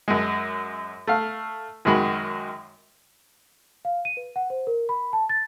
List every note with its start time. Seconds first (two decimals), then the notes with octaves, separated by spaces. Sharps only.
0.08 F#2 G#3
1.07 A3 F5
1.85 F#2 D#3 G#3 F#4 B5
3.85 F5
4.05 D#7
4.17 B4
4.36 F#5
4.50 C5
4.67 A#4
4.89 B5
5.13 A5
5.29 A6